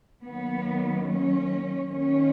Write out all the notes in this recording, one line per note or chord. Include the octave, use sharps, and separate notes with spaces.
D#3 F#3 A#3 B3
C#4
D#3 A#3 C#4